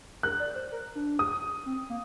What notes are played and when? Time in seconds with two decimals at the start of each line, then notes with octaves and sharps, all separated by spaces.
0.23 A#4 F#6
0.40 D5
0.55 C5
0.72 A#4
0.95 D4
1.19 D#6
1.66 C4
1.89 A#3